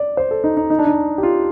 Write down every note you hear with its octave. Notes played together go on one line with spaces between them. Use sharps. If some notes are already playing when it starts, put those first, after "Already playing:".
Already playing: D5
C5
A4
D#4
D#4
D#4
D4
D#4
G4
F4